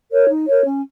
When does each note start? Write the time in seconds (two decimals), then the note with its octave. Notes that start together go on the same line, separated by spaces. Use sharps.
0.12 A#4 C#5
0.29 D#4
0.46 A#4 C#5
0.64 C#4